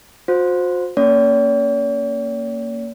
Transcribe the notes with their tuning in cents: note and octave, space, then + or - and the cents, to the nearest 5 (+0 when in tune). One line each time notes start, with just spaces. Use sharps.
F#4 -45 C5 +0
A#3 -15 C#4 +0 C#5 +45